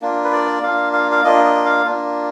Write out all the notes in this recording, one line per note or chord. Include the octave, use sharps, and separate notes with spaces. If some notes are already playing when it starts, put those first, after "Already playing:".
A#3 D4 F4
B4
D5
A#3 D4 F4 F5
F5
F5
A#3 D4 F4 D#5
D#5
F5
A#3 D4 F4